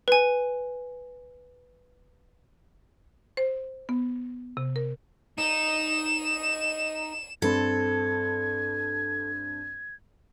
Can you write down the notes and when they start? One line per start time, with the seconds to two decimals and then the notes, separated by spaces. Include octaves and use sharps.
0.08 B4 G#5
3.37 C5
3.89 B3
4.57 C3
4.76 A#4
5.38 D#4 E7
7.42 G2 C4 A4 B5 G#6